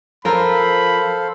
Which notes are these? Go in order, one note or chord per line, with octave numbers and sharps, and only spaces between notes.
F3 F4 A4 A#4 C5 F5 B5